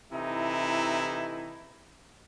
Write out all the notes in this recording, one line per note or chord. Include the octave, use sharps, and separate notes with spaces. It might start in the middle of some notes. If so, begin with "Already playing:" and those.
C3 E3 A3 D#4 E4